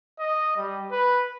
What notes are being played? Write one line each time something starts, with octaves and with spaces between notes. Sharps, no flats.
D#5
G3
B4